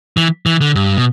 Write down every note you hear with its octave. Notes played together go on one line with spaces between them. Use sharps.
E3
E3
D3
G2
B2